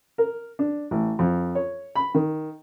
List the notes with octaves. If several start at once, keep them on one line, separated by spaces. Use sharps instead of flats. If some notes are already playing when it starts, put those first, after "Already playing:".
A#4
D4
A1
F2
C#5
B5
D#3